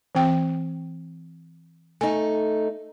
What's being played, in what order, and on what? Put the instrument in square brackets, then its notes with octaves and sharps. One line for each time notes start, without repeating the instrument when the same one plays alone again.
[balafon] E3 C4 G5
[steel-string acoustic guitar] A3 D#4 [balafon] G#5